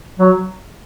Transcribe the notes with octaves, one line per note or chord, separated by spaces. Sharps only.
F#3